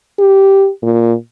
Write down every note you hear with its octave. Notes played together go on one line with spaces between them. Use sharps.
G4
A#2